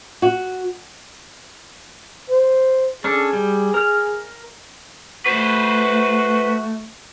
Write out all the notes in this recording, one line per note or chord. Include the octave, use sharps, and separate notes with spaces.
F#4
C5
C#4 D4 G#4 A4
G3
A#4 F6
A3 F#4 B4 C5